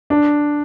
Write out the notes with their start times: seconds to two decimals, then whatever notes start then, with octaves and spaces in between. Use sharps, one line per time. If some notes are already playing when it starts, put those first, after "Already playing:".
0.10 D4